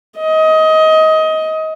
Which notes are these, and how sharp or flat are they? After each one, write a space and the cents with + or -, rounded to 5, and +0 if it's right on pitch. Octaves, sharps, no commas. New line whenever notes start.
D#5 +20